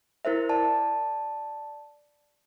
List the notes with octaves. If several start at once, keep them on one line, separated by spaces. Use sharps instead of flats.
E4 A#4 C5 E5
D5 A5